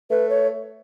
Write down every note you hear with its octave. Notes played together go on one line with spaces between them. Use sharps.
A3 B4
C#5